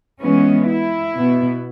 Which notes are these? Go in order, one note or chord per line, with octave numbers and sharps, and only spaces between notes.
E3 G#3 B3 C#4
E4
B2 B3